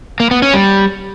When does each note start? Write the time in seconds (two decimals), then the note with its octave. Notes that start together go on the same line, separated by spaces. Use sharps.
0.20 A#3
0.31 B3
0.42 C#4
0.53 G3